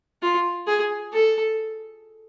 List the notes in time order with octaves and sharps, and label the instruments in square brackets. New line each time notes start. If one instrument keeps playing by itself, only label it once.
[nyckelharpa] F4
G#4
A4